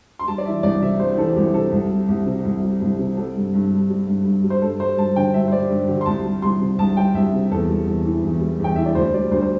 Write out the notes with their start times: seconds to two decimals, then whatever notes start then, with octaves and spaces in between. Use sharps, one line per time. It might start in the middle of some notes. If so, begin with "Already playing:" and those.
0.19 C6
0.27 G3 A5
0.38 D5
0.46 E3 E5
0.63 C2 D5
0.81 C3 E5
0.99 G3 C5
1.13 G4
1.17 E3 A4
1.36 C2 G4
1.54 C3 A4
1.72 C2
1.90 G3
2.08 C2
2.26 C3
2.45 C2
2.63 G3
2.81 C2
2.99 C3
3.17 G3 A4
3.36 G2
3.54 G2
3.71 G3
3.90 G3
4.07 G2
4.25 G2
4.44 G3
4.50 C5
4.62 G2 A4
4.80 G3 C5
4.97 G2 A5
5.16 D3 G5
5.34 G2 E5
5.48 C5
5.52 G3 D5
5.70 G2
5.88 D3 G4
6.01 C6
6.06 C2 A5
6.24 G3
6.42 C2 C6
6.61 C3
6.78 C2 A5
6.97 G3 G5
7.14 C2 E5
7.33 C3
7.52 E2 A4
7.69 G3
7.87 E2
8.05 E3
8.24 E2
8.41 G3
8.60 E2 G5
8.76 E3 E5
8.86 D5
8.95 D2 C5
9.14 G3 D5
9.31 D2 C5
9.42 C5